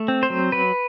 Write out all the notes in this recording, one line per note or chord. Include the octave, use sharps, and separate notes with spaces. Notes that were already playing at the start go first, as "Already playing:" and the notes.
Already playing: A3
C4
C5
F#3
F#3 B4